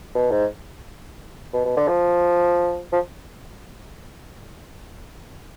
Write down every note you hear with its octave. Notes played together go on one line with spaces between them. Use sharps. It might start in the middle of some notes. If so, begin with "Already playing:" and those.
B2
G#2
B2
B2
D3
F3
F3